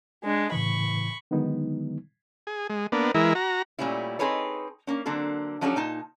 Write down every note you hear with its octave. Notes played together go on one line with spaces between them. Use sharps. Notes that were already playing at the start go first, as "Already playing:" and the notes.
G#3 D4
A2 C#3 E3 B5 C#6
D3 D#3 F#3 G#3 B3 D#4
G#4
G#3
A#3 B3 D4
E3 G#3 E4 A#4
F#4 A#5
A#2 G3 A3 C#4 E4
C4 D#4 G#4 A4 B4 C#5
A#3 C#4
D3 F#3 A#3 C4 A4
F3 F#3 C#4 D4 G4 A4
A#2 D#4 A5